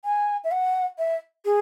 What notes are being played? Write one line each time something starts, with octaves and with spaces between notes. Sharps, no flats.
G#5
E5
F#5
E5
G#4